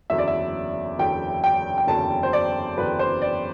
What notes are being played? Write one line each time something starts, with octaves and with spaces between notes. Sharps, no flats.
F#1 E2 D3 F#3 E5
D5
E5
F#1 E2 D3 F#3 G5
G5
G5
F#1 E2 D3 F#3 A5
C5
D5
F#1 E2 D3 F#3 B4
C5
D5